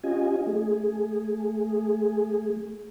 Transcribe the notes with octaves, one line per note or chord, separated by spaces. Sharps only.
C#4 F4 G4 D#5 G#5
A3 G#4